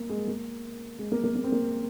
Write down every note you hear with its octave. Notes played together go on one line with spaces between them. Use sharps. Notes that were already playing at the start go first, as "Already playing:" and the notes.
Already playing: A#3
G#3
A#3
G#3
A#3
A#3
A#3
C4
A#3